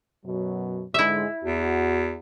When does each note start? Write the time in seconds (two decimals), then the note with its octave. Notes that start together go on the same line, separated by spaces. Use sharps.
0.25 F#2 B2 F#3
0.94 G#2 D3 G#3 E4 E5
1.44 E2 F#4